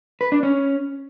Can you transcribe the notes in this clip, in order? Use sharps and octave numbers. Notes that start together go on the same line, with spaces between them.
B4
D4
C#4